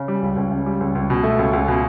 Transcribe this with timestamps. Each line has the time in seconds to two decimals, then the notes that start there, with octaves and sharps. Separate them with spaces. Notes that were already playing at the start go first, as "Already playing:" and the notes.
Already playing: C#3
0.08 G3
0.22 C#2
0.36 C#2
0.51 C#3
0.66 G3
0.80 C#2
0.95 C#2
1.10 B2
1.23 A3
1.39 C#2
1.53 C#2
1.68 B2